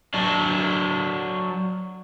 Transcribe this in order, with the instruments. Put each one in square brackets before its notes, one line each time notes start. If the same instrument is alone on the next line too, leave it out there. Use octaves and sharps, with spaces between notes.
[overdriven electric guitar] F#3 D4